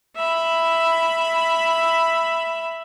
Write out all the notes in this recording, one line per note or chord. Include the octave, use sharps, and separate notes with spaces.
E5 B5